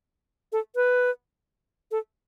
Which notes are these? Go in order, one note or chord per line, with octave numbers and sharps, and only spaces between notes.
A4
B4
A4